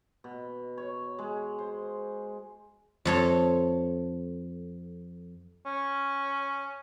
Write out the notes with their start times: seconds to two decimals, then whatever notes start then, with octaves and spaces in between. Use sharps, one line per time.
0.24 B2
0.78 C#5
1.19 G#3
1.59 C5
3.05 F2 A4 C#5
5.66 C#4